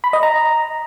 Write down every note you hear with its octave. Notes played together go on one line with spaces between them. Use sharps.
B5
D#5
A#5